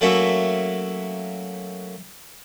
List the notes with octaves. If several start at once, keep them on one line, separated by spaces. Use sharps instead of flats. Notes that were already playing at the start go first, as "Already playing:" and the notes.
F#3 A3 A#3 C#4 F#4 E5